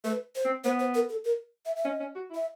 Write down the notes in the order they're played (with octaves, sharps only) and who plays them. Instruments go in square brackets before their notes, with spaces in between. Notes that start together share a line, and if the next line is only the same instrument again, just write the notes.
[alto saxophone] A3 [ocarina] B4
[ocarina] C5
[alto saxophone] C4
[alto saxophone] B3 [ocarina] C5
[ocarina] C5
A#4
A4
A#4
E5
E5
[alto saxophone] C#4 [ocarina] D#5
[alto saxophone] C#4
F#4
E4
[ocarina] E5